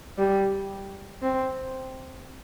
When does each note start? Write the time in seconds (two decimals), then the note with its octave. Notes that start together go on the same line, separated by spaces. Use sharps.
0.19 G3
1.22 C4